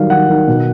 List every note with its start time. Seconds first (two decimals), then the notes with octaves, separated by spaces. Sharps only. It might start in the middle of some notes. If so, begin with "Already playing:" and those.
Already playing: D#3 F#3 G3 F5
0.10 D#3 F#5
0.29 D#3
0.47 B2